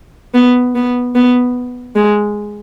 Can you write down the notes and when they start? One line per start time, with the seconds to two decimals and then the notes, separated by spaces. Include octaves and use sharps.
0.34 B3
0.75 B3
1.15 B3
1.95 G#3